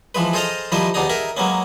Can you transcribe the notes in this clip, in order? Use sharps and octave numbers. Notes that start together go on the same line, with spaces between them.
E3 F3 G#3 B4
G#4 A4 C5 D#5 F5 A#5
D#3 F3 G3 E4 C5 D#5
D#2 B2 D4 D#4 G#4 A#5
D#4 G#4 A#4 E5
F#3 G#3 A#3 B3 C#4